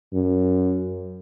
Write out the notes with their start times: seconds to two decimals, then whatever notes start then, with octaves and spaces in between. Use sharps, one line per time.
0.13 F#2